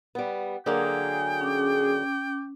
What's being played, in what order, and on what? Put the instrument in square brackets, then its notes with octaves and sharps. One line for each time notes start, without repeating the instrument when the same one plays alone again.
[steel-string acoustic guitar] G3 B3
[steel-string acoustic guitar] D3 F#3 A#3 [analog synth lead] G#4 [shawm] G5
[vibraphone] C#4 D6